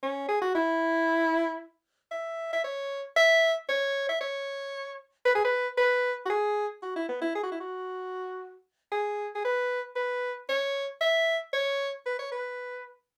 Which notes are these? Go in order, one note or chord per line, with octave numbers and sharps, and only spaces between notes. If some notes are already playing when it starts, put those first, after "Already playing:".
C#4
G#4
F#4
E4
E5
E5
C#5
E5
C#5
E5
C#5
B4
G#4
B4
B4
F#4
G#4
F#4
E4
B3
E4
G#4
F#4
E4
F#4
G#4
G#4
B4
B4
C#5
E5
C#5
B4
C#5
B4